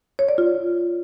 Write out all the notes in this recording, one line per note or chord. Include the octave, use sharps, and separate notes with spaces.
C#5
D5
F4